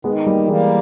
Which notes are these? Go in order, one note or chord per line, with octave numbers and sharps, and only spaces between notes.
D#3 G#3 B3
G3 A#3
E3 G3 G#3 A#3